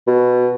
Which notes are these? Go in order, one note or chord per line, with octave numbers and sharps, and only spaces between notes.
B2